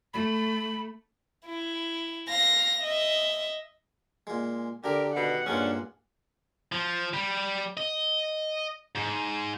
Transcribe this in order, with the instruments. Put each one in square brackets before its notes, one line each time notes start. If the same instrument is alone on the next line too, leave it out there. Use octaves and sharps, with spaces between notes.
[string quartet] A3 [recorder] B5
[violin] E4
F5 A#6
D#5 E5
[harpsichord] A#2 G#3
[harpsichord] D3 D4 [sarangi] G4 [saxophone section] A#4
[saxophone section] B2 D#3 [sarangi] F#5
[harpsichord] G2 A#2 G#3 [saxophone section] D#3 C#4 D4
[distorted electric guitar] F3
G3
D#5
G#2